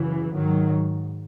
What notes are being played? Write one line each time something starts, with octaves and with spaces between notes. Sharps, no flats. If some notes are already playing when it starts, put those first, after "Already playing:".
Already playing: F#2 C#3 E3
G#2 D#3 F#3